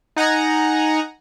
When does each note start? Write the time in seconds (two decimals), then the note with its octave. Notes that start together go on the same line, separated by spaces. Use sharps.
0.16 D#4 F#5 G#5 A#5